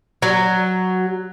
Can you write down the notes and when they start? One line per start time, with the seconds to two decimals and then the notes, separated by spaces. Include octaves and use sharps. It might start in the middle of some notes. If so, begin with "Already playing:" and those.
0.22 F#3